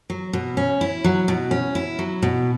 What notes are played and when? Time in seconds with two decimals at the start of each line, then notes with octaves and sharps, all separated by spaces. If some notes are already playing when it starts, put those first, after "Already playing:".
0.10 F#3
0.33 B2
0.57 C#4
0.81 E4
1.04 F#3
1.28 B2
1.51 C#4
1.75 E4
1.99 F#3
2.23 B2